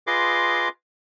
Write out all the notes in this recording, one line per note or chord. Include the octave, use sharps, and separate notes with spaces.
F4 G#4 B4 D#5 C6 D6